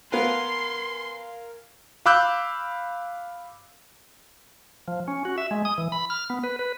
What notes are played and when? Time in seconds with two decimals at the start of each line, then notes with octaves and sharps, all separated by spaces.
0.12 B3 A#4 B4 F5 G#5 C6
2.06 F5 B5 D6 E6 F#6 G6
4.88 F3
5.08 C#4
5.25 F#4
5.38 E5
5.51 G#3
5.65 D#6
5.78 E3
5.92 B5
6.10 F6
6.30 B3
6.44 B4
6.59 B4